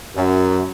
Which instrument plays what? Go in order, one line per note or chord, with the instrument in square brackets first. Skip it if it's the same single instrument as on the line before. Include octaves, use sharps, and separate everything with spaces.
[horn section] F#2